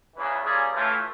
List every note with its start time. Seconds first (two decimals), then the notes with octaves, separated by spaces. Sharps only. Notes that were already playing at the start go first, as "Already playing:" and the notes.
0.16 E2 C#3 E3
0.44 G3 A#3 C#4 F4 G#4
0.72 A2 E3 A3 C#4 F4